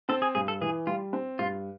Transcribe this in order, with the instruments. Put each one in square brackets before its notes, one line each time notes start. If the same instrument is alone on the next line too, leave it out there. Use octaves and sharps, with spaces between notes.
[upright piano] C4 [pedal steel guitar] A4
[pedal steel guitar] G#4
[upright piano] G2 [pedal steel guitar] G#4
[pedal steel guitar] A4
[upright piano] E3 [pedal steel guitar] G#4
[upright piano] G3 [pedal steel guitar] F4
[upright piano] C4
[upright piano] G2 [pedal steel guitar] F4